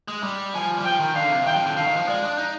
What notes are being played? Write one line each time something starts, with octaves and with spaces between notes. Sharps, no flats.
G#3
G3
F3 G#5
G3
F3 G5
D#3
D3 F5
C3
D#3 G5
F3
D3
D3 F5
D#3
F3
G#3 D5
D4
D#4